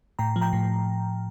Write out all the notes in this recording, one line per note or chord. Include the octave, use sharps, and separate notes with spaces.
A2 G5 A#5
F3
G5 A#5
A2